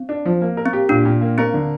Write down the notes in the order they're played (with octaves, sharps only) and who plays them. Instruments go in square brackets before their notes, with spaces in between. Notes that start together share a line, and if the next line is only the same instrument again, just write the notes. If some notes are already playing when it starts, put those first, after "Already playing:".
Already playing: [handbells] C4
[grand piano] D4
F3
A#3
A#4
[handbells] C4
[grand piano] G4
[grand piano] A#2 [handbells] D4
[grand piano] A#2
A#3
[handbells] C4 [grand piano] A#4
[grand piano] D3